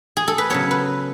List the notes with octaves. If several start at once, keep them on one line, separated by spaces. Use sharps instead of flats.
G#4
A4
B4
C#3 F#3 B3 C#5
B4